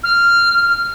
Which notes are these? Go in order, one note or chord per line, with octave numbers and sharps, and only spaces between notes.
F6